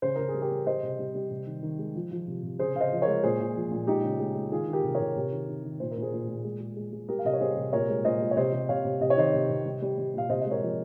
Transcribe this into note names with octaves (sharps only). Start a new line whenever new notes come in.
C#3 C5
C#3 A#4
G#4
G3
G4 A#4
G3
G3 C5 D#5
C3
G3
G3
C3
D#3
D#3
G#3
F3
F3
C3
C3
C#3 G#4 C5
C#3 F5
C5 D#5
F3
A#4 C#5
G#3
A#2 G#4 C5
A#2
F3
A#2
G#3 D#4 G4
C#3
G#3
G#3
D#3 F4 G#4
D#3
G4 A#4
C3
A#4 C#5
C3
C3
D#3
D#3
D#3
A#2 C5
A#4
A#2
G#4 C5
A#2
A#2
G#3
G#3
G#3
G#3
G3 G4 A#4
F5
C3 D#5
C#5
G3 G#4 C5
C3
A#2 A#4 C#5
G#3
A#2 C5 D#5
G#3
C#5
C3 C5 D#5
C3
C3 C#5 F5
C3
C3 D#5
C#5
D#3 C5 D#5
C3
C3
G3
G3
G3
A#2 F5
C3 C5 D#5
G#3 D#5
A#4 C#5
F3